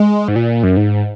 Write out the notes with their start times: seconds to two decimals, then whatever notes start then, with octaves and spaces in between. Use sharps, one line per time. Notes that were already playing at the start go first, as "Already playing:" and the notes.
Already playing: G#3
0.28 G#2
0.36 A#2
0.63 F#2
0.77 G#2